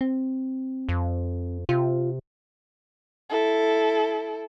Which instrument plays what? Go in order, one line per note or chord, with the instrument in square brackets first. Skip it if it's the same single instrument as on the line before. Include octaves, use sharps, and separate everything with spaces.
[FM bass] C4
[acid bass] F2
[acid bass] C3 [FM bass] F4
[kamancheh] E4 A4